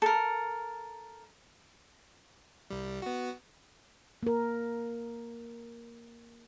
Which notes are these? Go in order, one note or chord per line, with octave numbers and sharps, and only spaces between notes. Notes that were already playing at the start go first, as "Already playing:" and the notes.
A4 A#4
C2 G3
B3 F#4
A#3 A#4